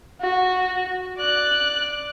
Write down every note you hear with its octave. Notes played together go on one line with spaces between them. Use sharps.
F#4
D5 F#6